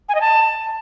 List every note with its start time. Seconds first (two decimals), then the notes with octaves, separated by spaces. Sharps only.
0.09 G#5
0.15 D#5
0.21 A5